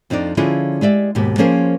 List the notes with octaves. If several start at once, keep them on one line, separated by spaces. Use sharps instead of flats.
F2 F3 D4 D#4 D5
D3 F3 C#4 E4 F4 G#4
G#3 G4 D5 E5
D#2 G#2 B2 G4
F3 A#3 C#4 G#4 A#4 C5